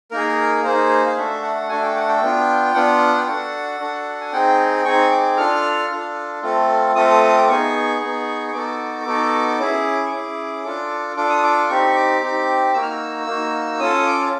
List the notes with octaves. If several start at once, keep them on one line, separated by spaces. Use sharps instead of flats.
A#3 D#4 G#4 A#4
A#3 D#4 G#4 C5
F5
A3 D4 F#4 A4 E5
F#5
A3 D4 F#4 A4 G#5
G5
F#5
G5
B3 D4 F4
B3 D4 F4 F#5
G5
D4 F#4 A4 F#5
D4 F#4 A4
G#5
C4 D#4 G#4 G5
C4 D#4 G#4 C#6
D6
D4 F4 A4 F6
D4 F4 A4
A3 C4 F4 A4
A3 C4 F4 A4 D#6
D6
B3 D#4 G#4 C#6
B3 D#4 G#4
C#6
B3 D#4 F#4 A4 D6
B3 D#4 F#4 A4
C#4 E4 G#4
C#6
C#4 E4 G#4 D6
D4 F4 A4 D6
D4 F4 A4 D6
D#6
D6
C4 D#4 G4 C#6
C#6
D6
C4 D#4 G4
A#3 D#4 F#4 E6
F6
E6
A#3 D#4 F#4
C#4 F4 A4 D#6
D6